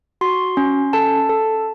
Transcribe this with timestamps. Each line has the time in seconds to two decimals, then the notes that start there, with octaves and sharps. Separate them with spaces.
0.21 F#4 C6
0.57 C#4
0.93 A4 A5
1.29 A4